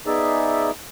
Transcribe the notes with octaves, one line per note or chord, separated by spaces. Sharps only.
B3 D#4 G#4 D5 E5